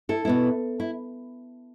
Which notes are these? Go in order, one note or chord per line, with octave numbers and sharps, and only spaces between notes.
E4 A4
B2 B3 E4
E4